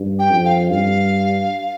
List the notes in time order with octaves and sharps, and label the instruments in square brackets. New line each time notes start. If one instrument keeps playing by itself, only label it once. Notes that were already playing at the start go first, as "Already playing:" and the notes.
Already playing: [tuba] G2
[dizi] G5
[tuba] F2
[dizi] F5
[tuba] G2 [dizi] F5